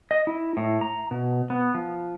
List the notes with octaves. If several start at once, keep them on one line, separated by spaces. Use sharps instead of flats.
D#5
E4
A2
A#5
B2
B3
F3